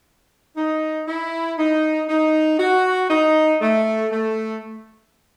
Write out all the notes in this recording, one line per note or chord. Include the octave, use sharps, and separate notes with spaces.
D#4
E4
D#4
D#4
F#4
D#4
A3
A3